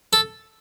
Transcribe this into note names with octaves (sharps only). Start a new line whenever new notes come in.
A4